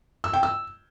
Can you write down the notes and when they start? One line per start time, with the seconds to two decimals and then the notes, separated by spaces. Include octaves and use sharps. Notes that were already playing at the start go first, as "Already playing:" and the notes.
0.24 E6
0.33 G5
0.43 E6